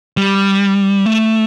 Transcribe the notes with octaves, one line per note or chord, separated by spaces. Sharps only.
G3
A3